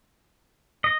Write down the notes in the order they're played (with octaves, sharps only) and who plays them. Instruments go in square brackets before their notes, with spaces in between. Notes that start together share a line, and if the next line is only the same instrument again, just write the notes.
[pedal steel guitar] D#5